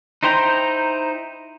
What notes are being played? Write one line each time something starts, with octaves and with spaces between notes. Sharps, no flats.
D#4 E4 C5 G5 A#5